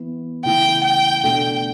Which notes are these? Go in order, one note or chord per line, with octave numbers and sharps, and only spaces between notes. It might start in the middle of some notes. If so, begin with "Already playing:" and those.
Already playing: E3 B3 E4
C#3 E3 A3 E4 G5
G5
B2 A3 D4 A4 G5